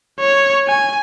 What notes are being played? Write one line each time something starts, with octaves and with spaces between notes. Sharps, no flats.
C#5
G#5